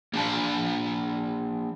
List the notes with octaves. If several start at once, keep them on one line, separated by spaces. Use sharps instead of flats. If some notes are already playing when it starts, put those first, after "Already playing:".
A#3 D4 F5 A5